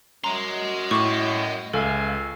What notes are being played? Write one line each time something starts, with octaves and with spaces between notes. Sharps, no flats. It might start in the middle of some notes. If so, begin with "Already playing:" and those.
F#2 D#5 A#5 C6
A2 C#6 D6 E7
C#2 A4 E5 F5 G#5